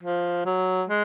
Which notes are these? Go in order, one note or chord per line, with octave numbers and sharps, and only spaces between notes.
F3
F#3
G#3